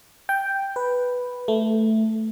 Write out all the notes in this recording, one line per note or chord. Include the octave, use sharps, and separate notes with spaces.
G5
B4
A3